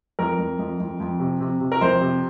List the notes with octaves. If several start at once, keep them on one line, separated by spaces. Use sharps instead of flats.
F2 A#4
F2
F2
F2
F2
C3
C3
C3
A#4
F2 C5
C3